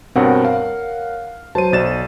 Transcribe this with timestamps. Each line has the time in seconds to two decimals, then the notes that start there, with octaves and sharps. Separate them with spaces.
0.15 G2 B2 C4 A#4 C#5 F#5
0.45 F5
1.55 F#3 C5 A5 D#7
1.73 B1 D5 A6 E7